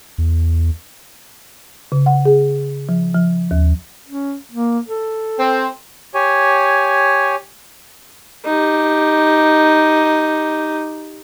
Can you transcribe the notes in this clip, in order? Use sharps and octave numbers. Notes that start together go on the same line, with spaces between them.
E2
C#3
F#5
G#4
F3
F3
D#2
C#4
A#3
A4
C4
G4 C#5 G#5
D#4 G4